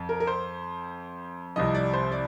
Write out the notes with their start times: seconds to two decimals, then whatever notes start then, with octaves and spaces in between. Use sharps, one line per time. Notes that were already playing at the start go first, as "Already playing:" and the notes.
Already playing: F2
0.09 A#4
0.20 A#4
0.27 C5
1.56 C2 C3 F3 D#5
1.75 D5
1.93 C5
2.12 D5